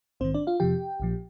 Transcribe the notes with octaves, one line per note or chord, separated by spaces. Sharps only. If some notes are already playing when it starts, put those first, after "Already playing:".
A#1 G#2 D#3 C4 C5
D4 D5
F4 F5
F2 C3 F3 G4 G5
A#1 A#2 F3